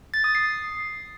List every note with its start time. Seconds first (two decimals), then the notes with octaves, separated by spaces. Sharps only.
0.14 A6
0.24 D#6
0.35 C7